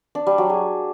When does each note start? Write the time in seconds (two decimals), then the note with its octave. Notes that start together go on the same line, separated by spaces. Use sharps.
0.15 D4
0.27 G3
0.38 F#3
0.50 G#4